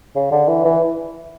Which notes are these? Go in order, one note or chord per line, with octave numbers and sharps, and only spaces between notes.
C#3
D3
E3
E3